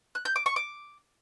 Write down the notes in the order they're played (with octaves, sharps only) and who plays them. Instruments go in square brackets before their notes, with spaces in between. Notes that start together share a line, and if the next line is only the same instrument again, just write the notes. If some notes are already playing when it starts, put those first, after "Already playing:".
[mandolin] F#6
G6
D6
C#6
D6